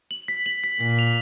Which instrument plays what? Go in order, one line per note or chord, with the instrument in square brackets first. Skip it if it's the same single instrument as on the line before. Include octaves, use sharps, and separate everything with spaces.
[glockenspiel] F#7
B6
F#7
B6
[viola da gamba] A#2 [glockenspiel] B6
[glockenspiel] F7